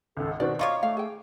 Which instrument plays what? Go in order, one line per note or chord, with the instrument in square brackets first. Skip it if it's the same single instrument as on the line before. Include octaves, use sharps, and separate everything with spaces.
[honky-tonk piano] G#1 C#2 [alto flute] A4
[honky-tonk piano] B2 D#3 C4 [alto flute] F#4 [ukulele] D5
[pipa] D#4 F4 C#5 [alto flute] F5 [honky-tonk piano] C#6 D6
[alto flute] A3 [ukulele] F5
[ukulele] G#4 G5